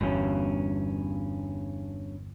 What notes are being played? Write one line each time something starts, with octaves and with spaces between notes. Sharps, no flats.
G1 E2 G2 C#4